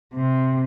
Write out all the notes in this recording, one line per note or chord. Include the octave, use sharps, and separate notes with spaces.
C3